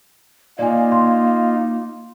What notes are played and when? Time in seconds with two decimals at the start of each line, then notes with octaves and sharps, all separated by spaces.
0.59 A#3 D#4 F4 D5 G#5
0.92 C6